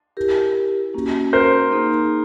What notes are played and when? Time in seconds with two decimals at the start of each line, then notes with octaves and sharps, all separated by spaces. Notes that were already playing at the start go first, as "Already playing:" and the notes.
0.17 E4 G4 A#4
0.94 A#3 C#4 F#4
1.33 A#4 C5
1.72 A#3 D#4 G#4